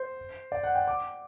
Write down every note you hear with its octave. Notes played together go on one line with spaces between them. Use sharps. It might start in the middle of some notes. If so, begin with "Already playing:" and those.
Already playing: C5
D5
F#5
G5
D6